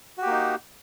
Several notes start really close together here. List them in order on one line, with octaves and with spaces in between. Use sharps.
F#4 G4 A#3 D#4